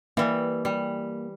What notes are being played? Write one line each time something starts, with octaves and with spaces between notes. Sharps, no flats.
E3 G3 A#3
G3